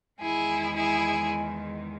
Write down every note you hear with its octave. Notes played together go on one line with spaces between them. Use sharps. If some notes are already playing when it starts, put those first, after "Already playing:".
E2 D#3 G#3 E4 G#4
E4 G#4